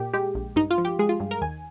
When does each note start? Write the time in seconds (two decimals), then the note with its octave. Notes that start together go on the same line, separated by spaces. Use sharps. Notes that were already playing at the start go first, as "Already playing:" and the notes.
Already playing: A#2 G4
0.13 G#3 G4
0.35 A#1
0.56 G2 D#4
0.70 F4
0.78 F3
0.85 G4
0.99 G#3 G#4
1.09 F4
1.20 G2
1.31 A#4
1.41 D#2 G#5